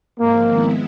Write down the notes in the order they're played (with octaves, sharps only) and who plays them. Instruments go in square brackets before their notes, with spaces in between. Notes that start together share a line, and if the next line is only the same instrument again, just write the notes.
[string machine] G#2 F3 G#3 C4 [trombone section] A#3
[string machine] D#3 G#3 B3 E4